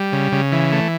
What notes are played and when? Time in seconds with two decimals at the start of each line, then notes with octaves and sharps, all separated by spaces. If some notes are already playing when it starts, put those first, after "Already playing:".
Already playing: G3
0.12 C#3
0.32 C#3
0.52 E3
0.73 A3